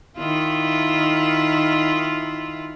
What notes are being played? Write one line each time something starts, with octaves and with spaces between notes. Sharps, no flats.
D#3 E4 F4